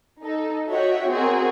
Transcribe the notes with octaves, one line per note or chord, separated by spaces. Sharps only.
D#4 A4
F#4 C#5 D#5 E5 F#5 G5
C4 F#4 G#4 A#4